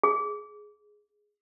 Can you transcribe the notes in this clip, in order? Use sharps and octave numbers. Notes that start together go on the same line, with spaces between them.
G#4